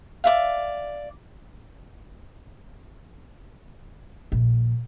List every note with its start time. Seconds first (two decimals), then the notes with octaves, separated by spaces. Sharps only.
0.24 D5 E5 F5
4.32 A#1